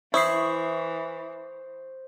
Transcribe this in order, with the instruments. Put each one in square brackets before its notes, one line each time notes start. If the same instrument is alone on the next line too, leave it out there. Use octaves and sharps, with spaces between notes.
[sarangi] E3 [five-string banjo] E4 [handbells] C5 [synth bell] C#6 D#6 C7